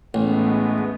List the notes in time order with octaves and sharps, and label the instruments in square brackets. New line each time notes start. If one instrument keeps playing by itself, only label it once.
[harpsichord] A1 [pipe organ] G#3 A3 B3